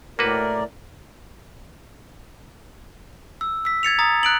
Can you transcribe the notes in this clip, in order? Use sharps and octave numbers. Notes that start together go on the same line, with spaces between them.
A2 A#3 F#4 A#4 B4 D5
E6
E6 B6
G#6 A6 C#7 F7
A#5 D#6 A6
F#6 D7 F#7